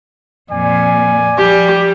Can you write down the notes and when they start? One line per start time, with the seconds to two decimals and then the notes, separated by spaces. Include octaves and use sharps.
0.52 F2 A#2 D5 G#5
1.37 F3 G3 G4